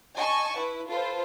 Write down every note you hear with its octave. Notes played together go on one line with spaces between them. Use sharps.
D#5 G#5 A5 C#6
E4 B4
F4 A4 B4 C5